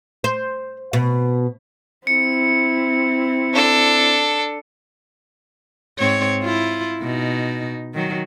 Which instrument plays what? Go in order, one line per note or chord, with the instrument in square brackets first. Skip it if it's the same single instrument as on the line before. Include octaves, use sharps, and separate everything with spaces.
[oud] C5
B2
[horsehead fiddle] C4 E4 [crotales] C#7
[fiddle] D4 A4
[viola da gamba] G#2 C4 C#5
E4 F4
B2 D#4
D#3 F#3